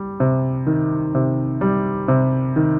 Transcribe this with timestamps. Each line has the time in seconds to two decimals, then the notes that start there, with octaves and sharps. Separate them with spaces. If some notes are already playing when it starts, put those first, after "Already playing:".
Already playing: G3
0.20 C3
0.67 D#3
1.15 C3
1.61 G3
2.08 C3
2.56 D#3